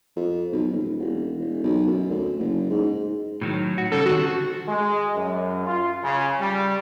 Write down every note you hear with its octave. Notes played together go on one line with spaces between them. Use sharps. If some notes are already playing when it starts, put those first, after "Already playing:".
F2
B1
D#1
E1
E1
B1
F#2
D2
F#1
G#2
A2 D#3 F#3
F#4
C#3 G3 C#4 A4
D3 D#3 C4 F#4
G#3
F#2
F4
C#3
G3